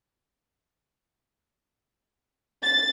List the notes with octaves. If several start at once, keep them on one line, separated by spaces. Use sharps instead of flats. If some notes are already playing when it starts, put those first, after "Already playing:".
A6